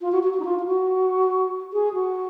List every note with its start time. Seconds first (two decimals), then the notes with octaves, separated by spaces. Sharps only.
0.01 F4
0.12 F#4
0.23 F#4
0.34 F#4
0.40 D#4
0.45 F4
0.59 F4
0.66 F#4
1.73 G#4
1.94 F#4